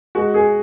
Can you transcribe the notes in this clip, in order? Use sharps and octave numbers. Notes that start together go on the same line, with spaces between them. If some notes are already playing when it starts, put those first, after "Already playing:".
G#3 F#4
G#4